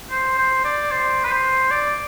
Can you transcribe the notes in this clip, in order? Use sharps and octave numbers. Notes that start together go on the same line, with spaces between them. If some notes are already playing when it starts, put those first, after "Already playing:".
C5
C5
D5
C5
B4
C5
D5